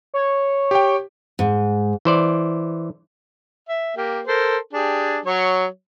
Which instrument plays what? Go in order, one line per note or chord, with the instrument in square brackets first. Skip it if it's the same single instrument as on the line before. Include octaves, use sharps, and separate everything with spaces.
[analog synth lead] C#5
[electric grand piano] G4 G5
[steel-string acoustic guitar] G#2
[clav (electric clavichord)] E3 C5 D5
[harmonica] E5
A#3 G4
A4 A#4 C5
D4 G4 G#4
F#3 C#5